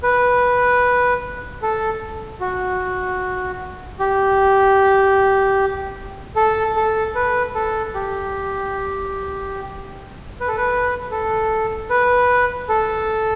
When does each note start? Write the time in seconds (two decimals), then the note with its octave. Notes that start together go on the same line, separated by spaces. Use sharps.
0.03 B4
1.62 A4
2.41 F#4
3.99 G4
6.36 A4
6.76 A4
7.15 B4
7.55 A4
7.95 G4
10.40 B4
10.48 A4
10.57 B4
11.11 A4
11.90 B4
12.69 A4